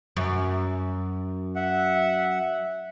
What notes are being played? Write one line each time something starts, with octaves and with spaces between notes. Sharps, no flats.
F#2
E5 F#5